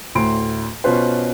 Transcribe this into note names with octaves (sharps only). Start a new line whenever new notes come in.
D2 A2 C6 D7
B2 C#4 F4 B4 C5